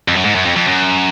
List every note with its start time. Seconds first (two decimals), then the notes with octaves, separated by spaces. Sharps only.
0.08 F2
0.16 F#2
0.25 G#2
0.35 F#2
0.45 F2
0.56 F2
0.68 F#2